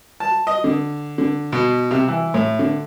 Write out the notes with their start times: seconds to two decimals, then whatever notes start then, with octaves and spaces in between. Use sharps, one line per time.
0.20 A5
0.47 D#5
0.64 D3
1.18 D3
1.52 B2
1.91 C3
2.08 E3
2.34 A2
2.59 D3